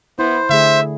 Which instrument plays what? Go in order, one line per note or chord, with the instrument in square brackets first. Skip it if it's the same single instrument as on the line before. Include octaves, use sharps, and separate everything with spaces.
[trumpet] B3 [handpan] E4 [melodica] C5
[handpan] D3 A3 G#4 [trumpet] E5